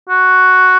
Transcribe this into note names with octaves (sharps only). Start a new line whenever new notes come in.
F#4